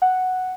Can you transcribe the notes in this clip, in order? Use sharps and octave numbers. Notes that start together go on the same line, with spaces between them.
F#5